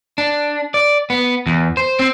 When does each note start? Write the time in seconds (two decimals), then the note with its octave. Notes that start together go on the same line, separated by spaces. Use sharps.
0.18 D4
0.74 D5
1.10 B3
1.47 E2
1.77 C5
1.99 C4